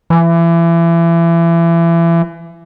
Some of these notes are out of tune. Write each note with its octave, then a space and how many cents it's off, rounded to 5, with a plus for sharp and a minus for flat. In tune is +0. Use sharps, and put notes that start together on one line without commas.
E3 +30